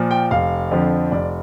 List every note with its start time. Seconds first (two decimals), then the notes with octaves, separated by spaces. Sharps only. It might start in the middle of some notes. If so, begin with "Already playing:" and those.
Already playing: A#2 F3
0.11 G5
0.31 F1 F5
0.71 F2 D3 F3
1.12 F1 D5